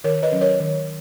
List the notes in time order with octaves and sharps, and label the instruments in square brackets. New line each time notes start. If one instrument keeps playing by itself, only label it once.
[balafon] D#3 A#4 C#5
B4 D#5
F#3 C#4
A#4 C#5
D#3